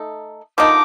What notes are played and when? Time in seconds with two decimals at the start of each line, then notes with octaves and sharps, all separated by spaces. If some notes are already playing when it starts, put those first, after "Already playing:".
Already playing: A3 D#4 A4
0.58 D3 F3 A#3 D#4 D6